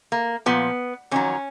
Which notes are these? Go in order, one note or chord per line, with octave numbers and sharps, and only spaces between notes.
A#3
A#2 F3 B3
F2 D#3 F#3 C#4